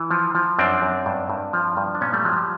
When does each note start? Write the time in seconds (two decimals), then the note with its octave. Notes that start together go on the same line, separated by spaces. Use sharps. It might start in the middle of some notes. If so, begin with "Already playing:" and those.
Already playing: E3
0.11 F3
0.35 F3
0.59 F#2 C4 D4
0.82 F#2
1.06 G2
1.30 G2
1.53 F3
1.77 G2
1.95 D4
2.01 A#2 B3 C#4
2.13 G3 A3
2.25 F3 F#3 G#3
2.36 G3